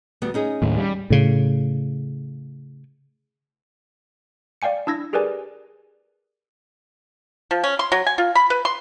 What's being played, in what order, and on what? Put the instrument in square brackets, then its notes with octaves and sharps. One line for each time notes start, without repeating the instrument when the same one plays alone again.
[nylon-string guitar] D2 G3 B3
C#4 D#4 G#4
[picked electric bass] D#2 A2
G3
[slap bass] A2 C#3
[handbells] D5 F5 G5 G#5 C#7
D4 E4 E6 G#6 A#6
G4 G#4 A#4 B4 D5 G#5
[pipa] F3
C#4
C6
F#3
G#5
F4
B5
B4
C6